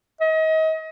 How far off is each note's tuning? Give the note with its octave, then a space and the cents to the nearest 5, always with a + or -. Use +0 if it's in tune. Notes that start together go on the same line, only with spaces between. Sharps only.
D#5 +35